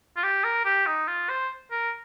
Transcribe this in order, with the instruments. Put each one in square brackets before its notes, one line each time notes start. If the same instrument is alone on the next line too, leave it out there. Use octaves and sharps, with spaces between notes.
[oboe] F4
G4
A#4
G4
D#4
F4
C5
A#4